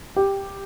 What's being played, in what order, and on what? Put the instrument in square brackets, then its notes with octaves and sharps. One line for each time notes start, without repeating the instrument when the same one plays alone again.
[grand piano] G4